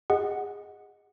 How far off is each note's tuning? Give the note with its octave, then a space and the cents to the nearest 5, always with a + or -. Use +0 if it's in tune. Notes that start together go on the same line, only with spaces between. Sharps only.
G#4 -25 D#5 +0 F#5 +0